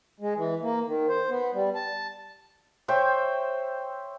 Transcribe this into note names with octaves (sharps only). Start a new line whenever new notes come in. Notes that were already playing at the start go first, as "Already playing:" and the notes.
G#3
E3
A#3
D#3
C5
B3
G3
A5
C5 C#5 E5 G5